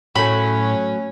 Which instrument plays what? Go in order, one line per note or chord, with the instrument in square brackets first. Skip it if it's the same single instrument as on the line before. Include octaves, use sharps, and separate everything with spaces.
[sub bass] A2 [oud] F#3 A3 [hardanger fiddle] C#4 C#5 [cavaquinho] B5